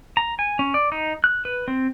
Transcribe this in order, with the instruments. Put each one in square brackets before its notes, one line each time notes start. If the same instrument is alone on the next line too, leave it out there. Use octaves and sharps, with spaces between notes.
[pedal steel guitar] A#5
G#5
C#4
D5
D#4
F#6
B4
C4